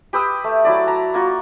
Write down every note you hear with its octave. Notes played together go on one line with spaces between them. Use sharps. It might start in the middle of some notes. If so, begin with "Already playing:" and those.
G4 B4 D#6 E6
A3
F#3 E4 D5
A5 A#5
A#3 F4 F#4